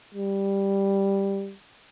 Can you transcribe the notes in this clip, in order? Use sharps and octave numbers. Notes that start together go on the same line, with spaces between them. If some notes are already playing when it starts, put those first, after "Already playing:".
G3